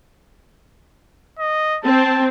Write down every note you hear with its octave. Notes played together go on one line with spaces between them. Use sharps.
D#5
C4 A5